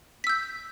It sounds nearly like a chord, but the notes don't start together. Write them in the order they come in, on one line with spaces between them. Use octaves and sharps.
B6 E6 G6